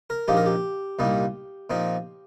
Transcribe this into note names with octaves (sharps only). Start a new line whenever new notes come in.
A#4
A#1 A#2 F3 A#3 D#4 G4
A#4
G4
C2 A#2 G3 A#3 D#4
A#2 F3 C4 D#4